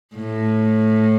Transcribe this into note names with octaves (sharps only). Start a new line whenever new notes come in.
A2